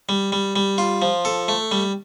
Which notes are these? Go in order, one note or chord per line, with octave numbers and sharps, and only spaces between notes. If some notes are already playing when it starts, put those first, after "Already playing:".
G3
G3
G3
F4
F3
A4
A3
G3